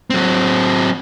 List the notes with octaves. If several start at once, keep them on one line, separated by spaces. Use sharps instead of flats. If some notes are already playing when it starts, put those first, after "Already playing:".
F#3 C4